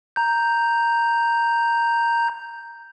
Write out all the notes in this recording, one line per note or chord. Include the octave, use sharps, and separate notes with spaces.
A#5 G6